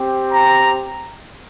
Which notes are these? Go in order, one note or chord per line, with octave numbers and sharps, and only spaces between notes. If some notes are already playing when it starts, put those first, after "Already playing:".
Already playing: C4 G4
A#5